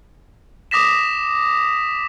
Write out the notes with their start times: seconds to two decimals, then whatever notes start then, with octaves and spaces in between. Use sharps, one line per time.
0.71 D6 D#6 A#6 B6 E7